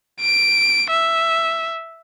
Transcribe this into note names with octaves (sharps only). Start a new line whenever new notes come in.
D7
E5